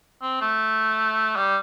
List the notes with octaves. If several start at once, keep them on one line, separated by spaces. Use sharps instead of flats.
C4
A3
G3